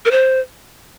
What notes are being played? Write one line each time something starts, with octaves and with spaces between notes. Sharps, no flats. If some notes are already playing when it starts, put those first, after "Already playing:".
A#4
C5